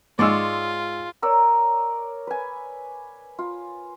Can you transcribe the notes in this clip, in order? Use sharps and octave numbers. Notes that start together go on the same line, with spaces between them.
G#2 G#3 F4 C#5 D5 E6
A#4 C#5 D5 E6
B4 G#5
F4